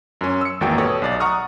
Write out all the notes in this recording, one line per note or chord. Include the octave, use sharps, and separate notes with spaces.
F#2 C#4
E6 C#7
G#1 E2 A#3 F#4 G5
B2 G4 A4 C#5 D#6
B1 D5 A6
F#5 A#5 C#6 D#6 F6